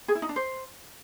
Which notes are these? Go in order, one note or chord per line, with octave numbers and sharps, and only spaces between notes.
G#4
E4
D#4
D4
C5